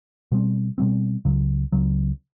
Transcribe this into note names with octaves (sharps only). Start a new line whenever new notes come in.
B2 G3 C4
B2 G3 C4
C#2 C#3 F#3
C#2 C#3 F#3